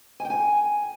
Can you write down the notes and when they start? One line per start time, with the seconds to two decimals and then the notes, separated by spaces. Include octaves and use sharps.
0.20 G#5
0.25 G5
0.30 G#5